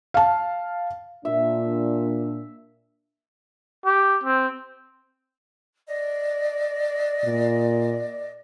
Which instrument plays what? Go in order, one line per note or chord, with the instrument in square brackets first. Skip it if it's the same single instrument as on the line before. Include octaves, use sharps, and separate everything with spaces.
[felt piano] F5 A5
[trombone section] A#2 D4 [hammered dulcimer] E5
[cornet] G4
C4
[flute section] D5 D#5
[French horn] A#2